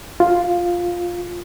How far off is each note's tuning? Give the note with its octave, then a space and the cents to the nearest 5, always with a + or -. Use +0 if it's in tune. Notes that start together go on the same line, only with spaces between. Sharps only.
F4 +5